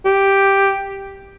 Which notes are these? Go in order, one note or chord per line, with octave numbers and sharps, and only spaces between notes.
G4